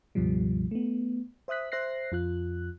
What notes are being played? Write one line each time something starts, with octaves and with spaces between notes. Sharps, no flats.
C#2 G2 B2 F3 G3
A3 B3
C5 E5 D#6 F#6 B6
C5 E5 F#6 A#6 C7
F2 F4 F#6